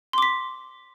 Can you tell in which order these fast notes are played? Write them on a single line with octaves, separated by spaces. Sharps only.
C6 D6 B6